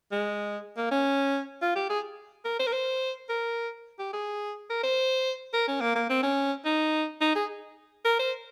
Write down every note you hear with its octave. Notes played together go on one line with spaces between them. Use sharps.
G#3
A#3
C#4
F4
G4
G#4
A#4
C5
A#4
C5
A#4
G4
G#4
A#4
C5
A#4
C#4
A#3
A#3
C4
C#4
D#4
D#4
G#4
A#4
C5